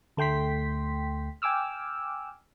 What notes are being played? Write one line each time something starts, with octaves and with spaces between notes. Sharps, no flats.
D2 A3 G5 C6 B6
G5 G#5 D6 E6 F6